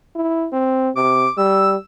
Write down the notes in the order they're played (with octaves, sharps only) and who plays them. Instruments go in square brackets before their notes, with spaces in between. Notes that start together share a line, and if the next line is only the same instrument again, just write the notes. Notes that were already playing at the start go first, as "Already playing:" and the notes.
[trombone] E4
C4
[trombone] C3 [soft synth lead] D6
[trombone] G3 [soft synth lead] E6